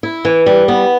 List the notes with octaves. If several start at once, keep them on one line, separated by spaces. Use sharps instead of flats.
E4
E3
G3
B3